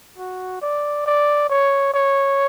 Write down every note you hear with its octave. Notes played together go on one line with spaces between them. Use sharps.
F#4
D5
D5
C#5
C#5